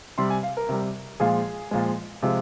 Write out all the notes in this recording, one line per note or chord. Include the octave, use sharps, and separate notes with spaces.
C3 G3 C6
G#5
F5
A#4
C3 G3
A#2 F3 G#3 G#4
A#2 F3 G#3
C3 F3 G#3